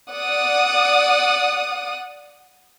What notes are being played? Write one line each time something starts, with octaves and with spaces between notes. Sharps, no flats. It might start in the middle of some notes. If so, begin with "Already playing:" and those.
D5 F#5 D#6